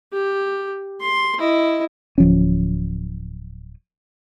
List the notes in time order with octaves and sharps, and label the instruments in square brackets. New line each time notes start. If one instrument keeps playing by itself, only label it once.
[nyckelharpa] G4
C6
E4 D#5
[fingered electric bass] D1 F3 C#4